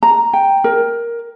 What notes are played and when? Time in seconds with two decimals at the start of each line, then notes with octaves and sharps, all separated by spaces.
0.03 A#5
0.33 G5
0.64 A#4